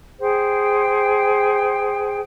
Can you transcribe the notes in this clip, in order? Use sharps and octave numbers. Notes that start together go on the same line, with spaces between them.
G#4 C5 G5